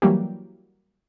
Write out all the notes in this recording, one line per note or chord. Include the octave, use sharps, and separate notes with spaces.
E3 F#3 G3 A#3 G4